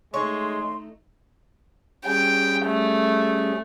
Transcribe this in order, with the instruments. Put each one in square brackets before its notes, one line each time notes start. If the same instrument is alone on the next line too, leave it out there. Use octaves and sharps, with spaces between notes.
[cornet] G#3 [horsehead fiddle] A3 D#4 [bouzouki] C#5 [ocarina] C6
[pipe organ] G3 C#4 G#4 [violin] G5
[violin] A3